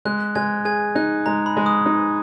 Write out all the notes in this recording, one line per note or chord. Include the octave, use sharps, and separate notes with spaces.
G#3 F#6
F#6
G#3 G#5 G#6
G#4 G#5 G#6
D#4 F#6
G#3 A#5
B5
G#3
D#6
D#4